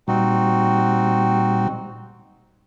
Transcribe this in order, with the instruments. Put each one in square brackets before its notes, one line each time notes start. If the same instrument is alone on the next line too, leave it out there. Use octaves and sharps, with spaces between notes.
[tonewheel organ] A#2 G3 [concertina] C4 D#4 F#4